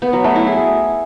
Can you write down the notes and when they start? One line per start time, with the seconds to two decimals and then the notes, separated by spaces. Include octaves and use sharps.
0.02 B3
0.13 F#3
0.24 A3
0.35 E4
0.47 G#4